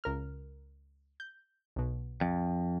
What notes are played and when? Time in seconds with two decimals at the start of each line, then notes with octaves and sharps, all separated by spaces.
0.04 C#2 A#4 F6
1.20 G6
1.76 B1 B2
2.21 F2